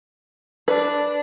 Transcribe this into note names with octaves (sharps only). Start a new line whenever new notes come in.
D4 B4